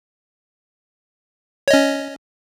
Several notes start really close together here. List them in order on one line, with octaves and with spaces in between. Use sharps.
C#5 D#5 C#4